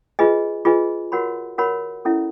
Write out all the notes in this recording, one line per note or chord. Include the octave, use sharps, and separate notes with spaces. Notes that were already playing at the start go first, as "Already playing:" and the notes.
F4 G#4 B4 D#5 G#5
F4 G#4 B4 D#5 G#5
F#4 A#4 C#5 F#5 B5
F#4 A#4 C#5 F#5 B5
C#4 E4 A4 C#5 E5